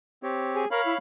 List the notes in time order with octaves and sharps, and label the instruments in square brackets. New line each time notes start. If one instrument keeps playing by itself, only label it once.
[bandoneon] C4 G4 C#5
[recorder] G#4
[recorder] A#4 [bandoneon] C#5 F5 B5
[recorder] E4